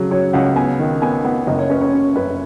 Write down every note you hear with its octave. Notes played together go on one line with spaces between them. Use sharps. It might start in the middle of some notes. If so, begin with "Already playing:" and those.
Already playing: C#3 F#3
F#3 C#5
C#2 F#5
B3 G#5
D#3
B3 G#5
B3 F#5
F#1 D#5
C#5
C#4 B4
C#5
C#4
F#2 B4